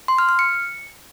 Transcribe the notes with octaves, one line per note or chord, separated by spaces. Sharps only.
C6
F6
F6
C#7